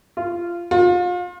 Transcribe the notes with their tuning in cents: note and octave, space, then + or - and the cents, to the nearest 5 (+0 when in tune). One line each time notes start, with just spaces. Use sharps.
F4 -15
F4 +35